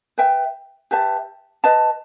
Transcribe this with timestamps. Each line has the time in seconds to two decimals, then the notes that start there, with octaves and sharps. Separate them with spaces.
0.18 B4 E5 G5
0.91 G4 B4 E5 A5
1.64 B4 D#5 A5